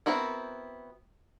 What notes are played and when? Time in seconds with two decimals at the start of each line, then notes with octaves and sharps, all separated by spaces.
0.06 B3 C4 E4 F#4 A#4